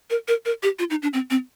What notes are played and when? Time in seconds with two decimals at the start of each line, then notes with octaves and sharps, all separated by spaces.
0.10 A#4
0.28 A#4
0.45 A#4
0.63 G4
0.79 F4
0.90 D#4
1.02 D4
1.13 C4
1.30 C4